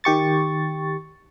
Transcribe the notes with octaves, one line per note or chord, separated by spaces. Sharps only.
D#3 G4 C#6 A6